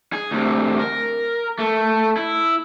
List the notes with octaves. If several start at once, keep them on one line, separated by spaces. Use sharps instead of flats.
G#4
D2 C3
A#4
A3
E4